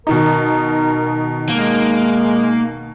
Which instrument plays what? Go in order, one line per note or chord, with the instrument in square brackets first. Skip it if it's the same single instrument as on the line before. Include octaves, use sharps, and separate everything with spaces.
[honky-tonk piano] B2 D#3 D#4 [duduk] A#4
[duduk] G#3 [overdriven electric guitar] A#3